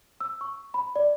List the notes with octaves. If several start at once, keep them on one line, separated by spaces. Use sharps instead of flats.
E6
C#6
B5
D5